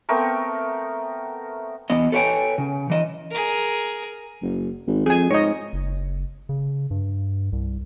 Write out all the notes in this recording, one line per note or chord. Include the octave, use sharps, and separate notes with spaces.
A3 B3 C4 A#4
E2 B3 D#5
A4 B4 C#5 F5 G5 G#5
C#3
E3 D#5
G#4 A#4
F#1
G#1
F2 G#4 G#5
G#2 C#5 D#5
F#1
C#3
G2
C2